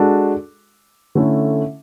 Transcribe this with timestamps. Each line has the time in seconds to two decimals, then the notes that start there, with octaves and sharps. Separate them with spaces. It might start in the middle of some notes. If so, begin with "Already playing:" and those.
Already playing: G#3 D4 F#4 A4
1.15 D3 A3 C#4 E4